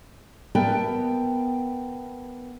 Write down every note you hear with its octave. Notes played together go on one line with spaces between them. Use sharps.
B3 A#4 E5 G5 A5